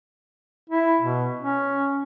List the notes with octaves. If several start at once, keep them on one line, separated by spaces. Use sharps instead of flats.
E4
B2
C#4